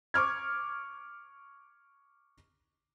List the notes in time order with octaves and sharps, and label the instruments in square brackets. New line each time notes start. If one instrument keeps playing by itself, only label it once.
[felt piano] C#6 D6 F6 G#6